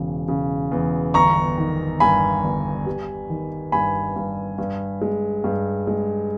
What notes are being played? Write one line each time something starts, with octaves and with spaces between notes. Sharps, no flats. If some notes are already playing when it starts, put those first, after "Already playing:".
Already playing: E1 C#3
C#3
E2
G1 A#5 C#6
D#3
G2 G#5 B5
G1
G3
D#3
G2 G#5 B5
G2
G2
G#3
G2
G#3